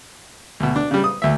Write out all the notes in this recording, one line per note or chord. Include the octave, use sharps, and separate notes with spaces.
D2 B2
D4
C#3 G3
D#6
D2 E5